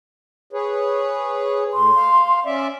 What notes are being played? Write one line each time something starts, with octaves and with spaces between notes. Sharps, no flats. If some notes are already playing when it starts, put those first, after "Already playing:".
G#4 B4 C#5
A2 C6
F5
C#4 D5 E5